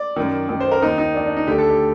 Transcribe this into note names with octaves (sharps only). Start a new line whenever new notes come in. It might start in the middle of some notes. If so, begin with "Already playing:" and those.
Already playing: D5
F#2 D#3
F#2 D#3
C5
A#4
D#2 D#3 D#4
D#4
D#2 D#3 D4
D4
D#4
D2 D3 G4
A4
G4